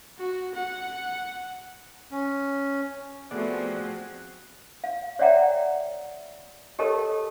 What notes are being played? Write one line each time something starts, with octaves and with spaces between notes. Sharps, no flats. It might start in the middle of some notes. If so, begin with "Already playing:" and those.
F#4
F#5
C#4
F3 A3 B3 C4 F#4 G#4 D5 F#6
F5
C#5 D5 E5 F#5 G5 A#5
G4 A4 A#4 C#5 D#5 A5